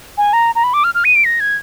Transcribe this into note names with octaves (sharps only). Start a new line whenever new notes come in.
G#5
A#5
A#5
B5
D6
F6
F6
D#7
D7
A#6
G#6